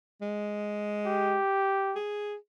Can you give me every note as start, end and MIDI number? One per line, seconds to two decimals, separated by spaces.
0.21 1.37 56
1.06 1.96 67
1.96 2.35 68